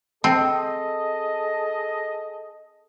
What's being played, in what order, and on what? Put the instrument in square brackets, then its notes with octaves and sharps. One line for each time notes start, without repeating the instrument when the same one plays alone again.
[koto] C4 [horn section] G#4 A4 D#5 [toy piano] G5 A5